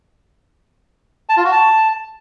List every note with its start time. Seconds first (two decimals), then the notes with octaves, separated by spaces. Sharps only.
1.29 A5
1.37 F4
1.44 F#4
1.52 A5